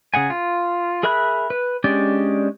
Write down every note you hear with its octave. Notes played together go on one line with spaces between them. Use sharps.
C#3 G#4 F#5 G#5
F4
G#4 A#4 E5 B5 F#6
B4
G#3 C#4 D4 G4 D5